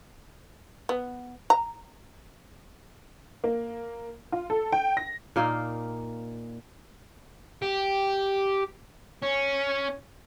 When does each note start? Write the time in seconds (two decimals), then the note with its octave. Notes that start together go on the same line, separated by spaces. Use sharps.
0.89 B3
1.50 A#5
3.44 A#3
4.32 F4
4.50 A4
4.73 G5
4.97 A#6
5.36 A#2 A#3 D#4 F4
7.62 G4
9.23 C#4